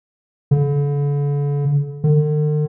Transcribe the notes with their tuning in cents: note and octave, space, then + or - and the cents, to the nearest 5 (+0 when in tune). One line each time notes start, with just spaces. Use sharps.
D3 -40
D3 +45